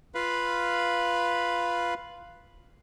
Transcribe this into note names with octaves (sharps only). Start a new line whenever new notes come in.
F4 B4 F5 B5